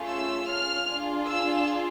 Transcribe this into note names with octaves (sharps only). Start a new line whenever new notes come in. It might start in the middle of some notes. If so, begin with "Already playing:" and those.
Already playing: A3 C#4 F4 G#4
E6
F6
D4 F4 G#4
E6